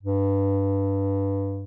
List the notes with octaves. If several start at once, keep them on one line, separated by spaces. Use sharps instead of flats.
G2